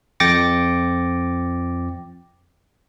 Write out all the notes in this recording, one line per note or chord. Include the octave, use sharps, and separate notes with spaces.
F2 G5 D6 A6 A#6 C#7